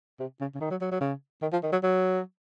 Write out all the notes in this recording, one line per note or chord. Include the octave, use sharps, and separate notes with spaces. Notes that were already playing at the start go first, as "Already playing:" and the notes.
C3
C#3
C#3
D#3
F#3
F#3
F#3
C#3
D#3
F3
D#3
F#3
F#3